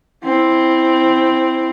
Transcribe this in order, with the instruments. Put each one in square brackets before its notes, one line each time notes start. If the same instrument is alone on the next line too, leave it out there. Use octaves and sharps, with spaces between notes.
[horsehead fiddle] C4 E4